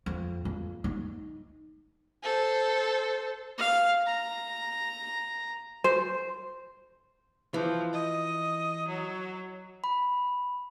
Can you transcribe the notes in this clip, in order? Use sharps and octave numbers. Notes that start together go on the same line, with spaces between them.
F2
F2
D#4
A4 C5
F5
A#5
C5
E3 F3
D#5
F#3
B5